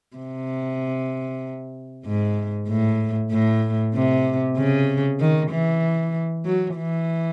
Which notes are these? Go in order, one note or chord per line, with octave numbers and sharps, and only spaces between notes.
C3
G#2
A2
A2
C3
C#3
D#3
E3
F#3
E3